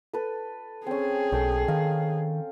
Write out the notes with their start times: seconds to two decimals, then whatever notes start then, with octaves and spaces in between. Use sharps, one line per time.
0.13 A4 B4
0.87 C4 C#4 G#4
1.32 B1 A4 G5
1.68 D#3 F5